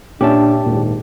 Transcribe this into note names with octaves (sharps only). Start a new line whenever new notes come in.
A#2 C#4 D4 G4 E5 A5
G#1 D#2 A#2